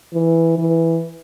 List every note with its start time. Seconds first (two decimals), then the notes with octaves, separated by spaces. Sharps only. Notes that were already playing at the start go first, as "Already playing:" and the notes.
0.14 E3
0.58 E3